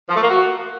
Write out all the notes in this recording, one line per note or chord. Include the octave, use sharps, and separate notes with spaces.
F3
A3
A#3
F#4